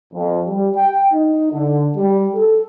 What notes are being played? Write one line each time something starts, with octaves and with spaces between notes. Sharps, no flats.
F2
G3
G5
D#4
D3
G3
A4